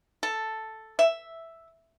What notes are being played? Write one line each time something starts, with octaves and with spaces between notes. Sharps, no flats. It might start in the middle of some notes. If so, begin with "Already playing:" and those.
A4
E5